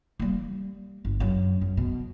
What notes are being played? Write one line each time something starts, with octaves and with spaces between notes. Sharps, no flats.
G3 A#3
G1
F#2
F#2
B2